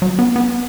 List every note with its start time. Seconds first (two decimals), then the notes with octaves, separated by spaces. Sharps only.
0.02 F#3
0.19 B3
0.36 B3